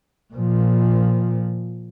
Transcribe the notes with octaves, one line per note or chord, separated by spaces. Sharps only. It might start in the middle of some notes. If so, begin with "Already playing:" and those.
A#2 F3